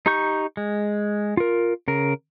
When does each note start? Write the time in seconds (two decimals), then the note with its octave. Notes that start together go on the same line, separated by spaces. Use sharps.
0.06 D#4 G4 A#5 C#6 G6
0.57 G#3
1.37 F4 A#4
1.88 C#3 A#4